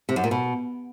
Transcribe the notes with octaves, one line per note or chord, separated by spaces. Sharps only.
C3
F#2
A#2
B2